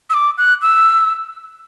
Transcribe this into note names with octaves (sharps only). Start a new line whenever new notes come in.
E6
D6
F#6
E6